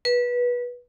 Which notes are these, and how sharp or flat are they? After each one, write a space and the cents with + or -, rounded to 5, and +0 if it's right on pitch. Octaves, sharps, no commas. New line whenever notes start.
B4 -20